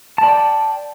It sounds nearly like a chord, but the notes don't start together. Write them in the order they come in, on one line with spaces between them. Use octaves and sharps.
A5 D5 G5